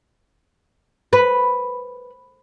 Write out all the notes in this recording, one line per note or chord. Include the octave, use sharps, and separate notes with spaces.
B4